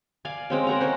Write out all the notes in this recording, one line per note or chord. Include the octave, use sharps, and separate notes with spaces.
D5 F5 G#5
G#3 C4 C#4
A#4 C5 F#5 A#5
C#4 C5